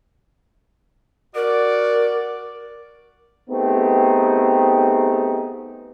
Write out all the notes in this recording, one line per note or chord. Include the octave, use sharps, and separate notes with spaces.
F#4 A#4 D5
A3 B3 C4 D#4 G4 G#4